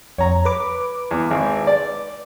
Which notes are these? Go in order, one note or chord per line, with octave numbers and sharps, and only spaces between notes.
F2 C#5 A#5
B4 D6
E2
G#1
D5